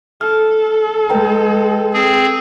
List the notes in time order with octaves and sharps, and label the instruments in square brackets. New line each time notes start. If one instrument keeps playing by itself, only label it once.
[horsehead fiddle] A4 [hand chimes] F6
[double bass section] G#3 [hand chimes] B4 G5 A#5
[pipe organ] C4 G#4